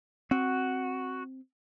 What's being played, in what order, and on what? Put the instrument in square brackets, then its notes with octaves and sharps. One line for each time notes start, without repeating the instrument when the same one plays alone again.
[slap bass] C4 [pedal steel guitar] F#4